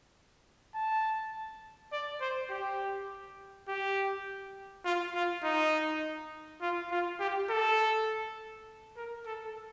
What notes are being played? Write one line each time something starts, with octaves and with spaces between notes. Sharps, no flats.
A5
D5
C5
G4
G4
F4
F4
D#4
F4
F4
G4
A4
A#4
A4